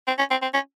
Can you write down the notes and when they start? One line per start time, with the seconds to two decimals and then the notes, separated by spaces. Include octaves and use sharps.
0.07 C4
0.18 C#4
0.31 C4
0.42 C4
0.54 C#4